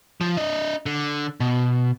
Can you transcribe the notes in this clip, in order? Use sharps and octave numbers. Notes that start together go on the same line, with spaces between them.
F3
D4 D#5
D3
B2